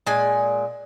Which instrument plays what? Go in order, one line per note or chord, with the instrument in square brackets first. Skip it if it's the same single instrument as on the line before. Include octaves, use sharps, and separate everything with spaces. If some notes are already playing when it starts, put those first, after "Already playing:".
[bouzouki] A#2 G#3 G#5